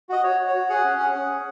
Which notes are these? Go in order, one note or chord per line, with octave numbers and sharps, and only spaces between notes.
F#4 D#5
F#4 C#5
F#4
C#5
F#4
G#4 F#5
C#4
G#4
G#4
C#4